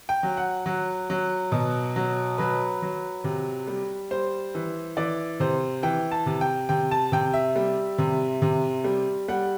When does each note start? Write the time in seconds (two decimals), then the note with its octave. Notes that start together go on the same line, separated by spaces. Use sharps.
0.09 G5
0.23 F#3
0.37 F#5
0.66 F#3
1.10 F#3
1.52 B2
1.96 F#3
2.38 F#3 B4
2.82 F#3
3.24 C3
3.67 G3
4.11 G3 C5
4.55 E3
4.97 E3 D5
5.40 C3 C5
5.83 E3 G5
6.11 A5
6.26 C3
6.41 G5
6.69 C3 G5
6.91 A5
7.12 C3 G5
7.34 E5
7.56 G3
7.98 C3
8.42 C3
8.84 G3
9.28 G3 F#5